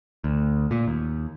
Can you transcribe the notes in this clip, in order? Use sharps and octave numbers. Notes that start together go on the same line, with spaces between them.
D2
A#2
D#2